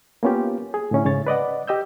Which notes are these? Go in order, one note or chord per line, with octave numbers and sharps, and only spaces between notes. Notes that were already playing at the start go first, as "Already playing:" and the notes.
A#3 B3 C#4 F4 G4
G#4
A2 D3 C#4 E4
G#2 C#3 C#5 A6
B4 D5 D#5 F#5
G4 D#5 E6 G6